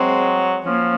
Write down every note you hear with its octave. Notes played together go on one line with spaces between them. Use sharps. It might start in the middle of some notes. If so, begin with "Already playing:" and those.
Already playing: F#3 G#3 C4
F3 A#3 C#4